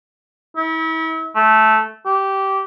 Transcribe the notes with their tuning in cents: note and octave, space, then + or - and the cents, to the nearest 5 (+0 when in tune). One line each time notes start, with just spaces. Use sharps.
E4 -35
A3 -10
G4 -15